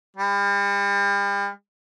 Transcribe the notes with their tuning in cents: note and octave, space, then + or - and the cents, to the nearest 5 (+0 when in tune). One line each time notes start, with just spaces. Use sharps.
G3 +40